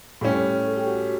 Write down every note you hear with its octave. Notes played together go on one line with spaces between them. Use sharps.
A2 G3 C#4 G4
A4
G4
F#4